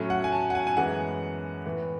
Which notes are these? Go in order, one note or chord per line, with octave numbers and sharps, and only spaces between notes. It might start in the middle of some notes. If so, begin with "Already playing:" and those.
Already playing: A2 F#3 A3 C#4
F#5
G#5
A5
F#5
G#5
G#5
F#2 E3 G#3 B3 F#5
A2 E3 B3